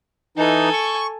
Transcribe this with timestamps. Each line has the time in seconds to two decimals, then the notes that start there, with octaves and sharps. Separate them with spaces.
0.37 E3 D#4 A4 G#5
0.73 C#6